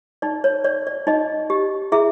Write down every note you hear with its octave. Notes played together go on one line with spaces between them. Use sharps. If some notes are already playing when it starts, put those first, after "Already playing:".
D#4 D5
C#5
C#5 D5
D5
D#4 D#5
G4
E4 G#4 E5